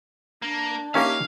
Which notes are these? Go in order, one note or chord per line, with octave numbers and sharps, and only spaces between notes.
A#3 D4
A#3 C#4 D#4 G4 E5 F5